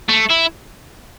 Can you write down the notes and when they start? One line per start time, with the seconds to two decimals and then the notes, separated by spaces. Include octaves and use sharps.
0.09 A3
0.30 E4